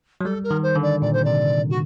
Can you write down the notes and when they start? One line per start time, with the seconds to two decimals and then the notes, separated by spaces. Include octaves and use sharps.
0.21 F#3
0.25 G3 A4
0.44 A#4
0.51 D#3
0.63 C5
0.76 D3
0.82 D5
1.02 A#2 D5
1.13 C5
1.24 C3 D5
1.70 F#4